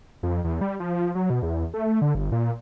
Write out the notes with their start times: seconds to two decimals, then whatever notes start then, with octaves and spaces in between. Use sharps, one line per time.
0.23 F2
0.44 E2
0.61 G3
0.80 F3
1.15 F#3
1.30 B2
1.43 E2
1.74 A3
2.02 D3
2.15 G1
2.32 A#2